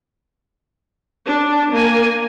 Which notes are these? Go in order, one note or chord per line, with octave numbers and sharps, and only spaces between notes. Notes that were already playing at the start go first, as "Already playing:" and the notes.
D4
A#3 G#5